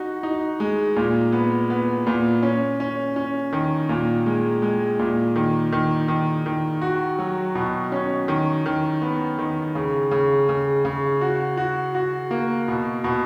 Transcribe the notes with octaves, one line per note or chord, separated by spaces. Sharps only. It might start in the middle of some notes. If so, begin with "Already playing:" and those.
Already playing: D#4 F#4
D#4
G#3
A#2
B3
B3
A#2
C#4
C#4
C#4
D#3
A#2
G#3
G#3
A#2
D#3
D#3
D#3
D#3
F#4
F#3
B2
C#4
D#3
D#3
B3
D#3
C#3
C#3
C#3
C#3
F#4
F#4
F#4
A#3
B2
B2